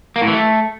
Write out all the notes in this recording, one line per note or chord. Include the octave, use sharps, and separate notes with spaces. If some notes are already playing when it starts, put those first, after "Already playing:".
A#3
A2
E3
A3